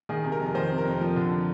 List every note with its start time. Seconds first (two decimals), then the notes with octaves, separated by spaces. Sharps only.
0.09 D#3 G#4
0.24 C3
0.32 A#4
0.39 F2
0.55 D#3 C5
0.70 C3
0.78 A#4
0.85 F2
1.01 F3
1.16 D3